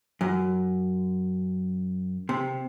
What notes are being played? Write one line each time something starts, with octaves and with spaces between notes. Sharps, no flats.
F#2
C3